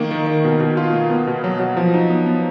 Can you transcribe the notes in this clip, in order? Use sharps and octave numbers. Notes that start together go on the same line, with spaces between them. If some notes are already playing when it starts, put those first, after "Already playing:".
Already playing: D#3 A#3
D#3
D#3
B2
B2
F4
A#3
B3
B2
F#3
F#3
F3
D#4
B3
B3